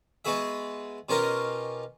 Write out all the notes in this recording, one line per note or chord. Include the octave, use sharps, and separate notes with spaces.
G#3 B3 F#4 G#4 E5
B2 C#4 F4 G4 A#4 D#5